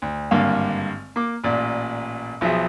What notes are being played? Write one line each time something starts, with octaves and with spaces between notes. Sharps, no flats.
D2
G#1 G2 D3 A#3 F5
A#3 D6
A1 A#2 D5
B1 F3 F#3 G#4 E5